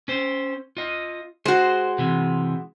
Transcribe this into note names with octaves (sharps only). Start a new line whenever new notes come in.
C#4 C5
F4 D#5
G#3 F#4 C5
C3 E3